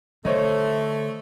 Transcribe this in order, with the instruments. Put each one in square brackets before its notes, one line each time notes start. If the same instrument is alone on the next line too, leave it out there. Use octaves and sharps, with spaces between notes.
[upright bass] D3 [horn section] A3 [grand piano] C5 C#5 D#5